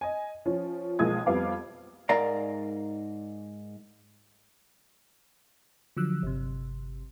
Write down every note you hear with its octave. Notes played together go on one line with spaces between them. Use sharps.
D#5 G#5
F3 C#4
B1 F3 G#3 A#3 D#6 G#6
F2 G3 B3 F5 D6
G#2 A#4 D5 F5 A#5
D3 F3 F#3 E6 F#6
G1 C3